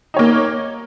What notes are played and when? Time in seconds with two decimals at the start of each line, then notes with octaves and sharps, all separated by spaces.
0.14 D#4
0.17 C#5
0.19 A#3